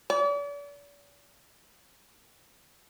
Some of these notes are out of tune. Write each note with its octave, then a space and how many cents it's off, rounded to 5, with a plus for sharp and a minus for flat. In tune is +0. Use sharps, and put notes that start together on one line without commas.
D5 -40